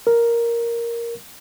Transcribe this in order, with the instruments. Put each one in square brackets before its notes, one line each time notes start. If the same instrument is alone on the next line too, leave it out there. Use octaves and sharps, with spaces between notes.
[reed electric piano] A#4